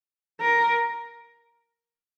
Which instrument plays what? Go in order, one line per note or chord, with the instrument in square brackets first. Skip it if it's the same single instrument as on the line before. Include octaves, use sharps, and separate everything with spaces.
[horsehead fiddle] A#4